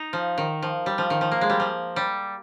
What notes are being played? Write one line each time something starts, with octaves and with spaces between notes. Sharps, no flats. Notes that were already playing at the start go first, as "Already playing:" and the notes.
Already playing: D#4
F3
D#3
F3
G3
F3
D#3
F3
A#3
G#3
G3
F3
G3